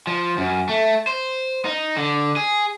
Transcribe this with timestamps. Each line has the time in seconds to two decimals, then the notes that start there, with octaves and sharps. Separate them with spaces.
0.07 F3
0.38 F#2
0.69 A3
1.07 C5
1.65 D#4
1.97 D3
2.36 G#4